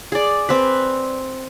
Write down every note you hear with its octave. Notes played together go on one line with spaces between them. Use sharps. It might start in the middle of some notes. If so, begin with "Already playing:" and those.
G#4 D5
C4 B4